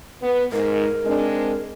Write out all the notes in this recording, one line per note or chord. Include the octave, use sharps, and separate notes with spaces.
B3
G#2 A#4
G#3 C4 D4